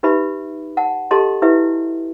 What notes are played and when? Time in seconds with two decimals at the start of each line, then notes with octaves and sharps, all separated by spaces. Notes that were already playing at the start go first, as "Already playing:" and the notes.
0.03 D#4 G4 B4 E5 B5
0.77 F#5 A5
1.11 G4 A4 D#5 A5 C6
1.42 E4 G4 B4 E5